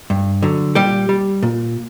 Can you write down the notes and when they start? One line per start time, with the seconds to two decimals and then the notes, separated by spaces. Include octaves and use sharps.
0.10 G2
0.43 D3 F#3
0.75 A#2 G3 G4
1.09 G3
1.43 A#2